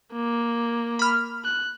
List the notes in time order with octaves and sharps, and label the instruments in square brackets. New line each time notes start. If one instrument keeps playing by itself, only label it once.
[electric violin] A#3
[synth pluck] B5 F6
[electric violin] F#6